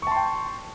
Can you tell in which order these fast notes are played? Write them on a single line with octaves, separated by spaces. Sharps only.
C#6 A5 C6 G5